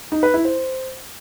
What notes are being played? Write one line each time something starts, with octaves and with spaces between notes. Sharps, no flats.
D#4
B4
E4
C5